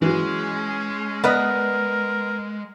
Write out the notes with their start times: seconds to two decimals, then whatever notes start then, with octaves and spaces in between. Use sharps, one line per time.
0.02 E3 F#3 G#3 C#4
1.24 B3 A#4 B4 D5 D#5